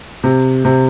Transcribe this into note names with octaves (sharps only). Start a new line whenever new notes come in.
C3
C3